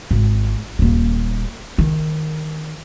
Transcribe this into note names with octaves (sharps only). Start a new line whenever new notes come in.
G#1
D#1 A#3
D#3